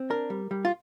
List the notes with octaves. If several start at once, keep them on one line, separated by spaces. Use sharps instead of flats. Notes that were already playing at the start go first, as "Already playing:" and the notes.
Already playing: C4
D4 A#4
G3
G3
F4